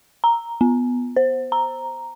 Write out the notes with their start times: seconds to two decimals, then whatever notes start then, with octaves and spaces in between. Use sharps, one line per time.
0.24 A#5
0.61 B3
1.16 C5
1.52 A#5